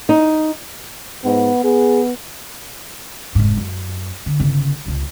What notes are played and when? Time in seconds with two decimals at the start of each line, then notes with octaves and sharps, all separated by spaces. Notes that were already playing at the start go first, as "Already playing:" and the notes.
0.09 D#4
1.24 G#2 B3
1.64 B3 G#4
3.35 F1 G#2
3.57 F#2
4.26 D3
4.40 G1 C#3
4.85 F1 C#2